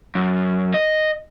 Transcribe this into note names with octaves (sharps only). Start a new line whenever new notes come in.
F#2
D#5